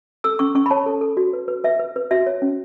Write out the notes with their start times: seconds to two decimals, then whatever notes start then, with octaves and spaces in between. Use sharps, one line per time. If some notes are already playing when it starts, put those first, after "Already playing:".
0.24 A4 E6
0.39 C#4 C#6
0.55 C#4 C#6
0.66 B5
0.71 C#5 A5
0.86 A4
1.01 A4
1.17 F#4
1.33 B4
1.48 B4
1.64 B4 E5
1.79 B4
1.96 B4
2.11 F#4 E5
2.27 C#5
2.42 C#4